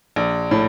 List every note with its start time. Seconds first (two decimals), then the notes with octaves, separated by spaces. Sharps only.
0.16 A#1
0.51 A2